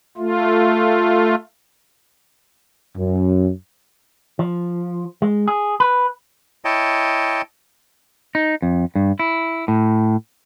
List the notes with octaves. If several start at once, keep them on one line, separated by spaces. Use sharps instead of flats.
A3 F4
F#2
F3
G#3
G#4
B4
E4 C#5 D#5 G5 A5
D#4
F2
G2
E4
A2